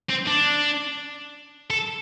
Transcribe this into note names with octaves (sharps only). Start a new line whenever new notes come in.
C4
D4
A4